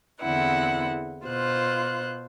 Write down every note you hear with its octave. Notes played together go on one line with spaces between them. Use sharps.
E2 D3 C4 E4 F#5
B2 F4 C5 F#6